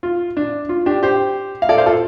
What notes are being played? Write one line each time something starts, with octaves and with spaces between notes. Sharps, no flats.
F4
D4
F4
D4 G4
G4 C5
F5
A4 D5
C5 F5
F4 A4